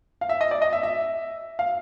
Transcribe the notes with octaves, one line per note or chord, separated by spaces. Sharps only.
F5
E5
D#5
D5
D#5
E5
E5
F5